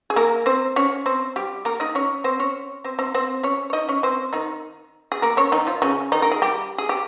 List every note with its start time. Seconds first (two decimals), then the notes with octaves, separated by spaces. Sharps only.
0.10 G#4
0.16 A#3 A#4
0.46 C4 C5
0.76 C#4 C#5
1.06 C4 C5
1.36 G3 G4
1.65 A#3 A#4
1.80 D#4 D#5
1.95 C#4 C#5
2.24 C4 C5
2.39 C#4 C#5
2.84 C4 C5
2.99 C4 C5
3.14 C4 C5
3.43 C#4 C#5
3.70 C#5
3.73 D#4 D#5
3.88 C#4 C#5
4.03 C4 C5
4.33 D#3 D#4
5.12 G#4
5.22 A#3 A#4
5.37 C#4 C#5
5.52 D#3 D#4
5.67 F3 F4
5.82 C#3 C#4
6.12 D#3 D#4
6.22 A#4
6.31 G#4
6.42 G3 G4
6.78 G#4
6.89 G4